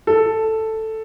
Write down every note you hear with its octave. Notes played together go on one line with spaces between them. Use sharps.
A4